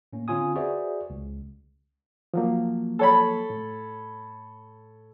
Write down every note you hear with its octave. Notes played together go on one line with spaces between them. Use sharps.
A2 A#3 C#4
D3 C4 C#4 F4 G#5 D#6
F#4 G#4 B4 C5 D5 E5
C#2
F3 F#3 A#3
A4 C#5 B5
A2